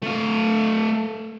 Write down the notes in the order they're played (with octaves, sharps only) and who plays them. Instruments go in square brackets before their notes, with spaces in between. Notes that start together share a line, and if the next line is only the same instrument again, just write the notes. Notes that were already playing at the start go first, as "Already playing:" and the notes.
[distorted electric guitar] A3 F5